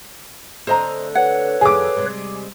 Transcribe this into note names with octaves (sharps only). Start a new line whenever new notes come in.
D3 A3 C4 C5 D#5 A#5
B4 C#5 F#5
F2 D3 G4 G#4 D6
C3 G3 G#3